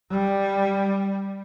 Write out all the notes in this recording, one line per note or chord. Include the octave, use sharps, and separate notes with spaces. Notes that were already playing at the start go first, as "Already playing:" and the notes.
G3